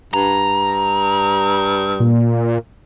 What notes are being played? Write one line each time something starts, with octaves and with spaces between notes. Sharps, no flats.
G2 A#5
A#2